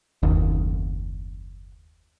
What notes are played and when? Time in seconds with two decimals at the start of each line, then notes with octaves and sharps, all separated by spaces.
0.23 F#1 D#2